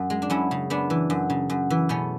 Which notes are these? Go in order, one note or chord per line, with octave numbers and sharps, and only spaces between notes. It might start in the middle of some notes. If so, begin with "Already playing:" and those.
Already playing: F#2
G#3
D4
F#2 C#4 E4
C#3
F#2 B3 D4
E3
F#2
C#3
F#2
E3
B2 A3 C#4